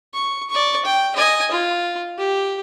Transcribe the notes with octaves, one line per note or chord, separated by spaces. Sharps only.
C#6
D5 C#6
G5
D#5 G#5
F4
G4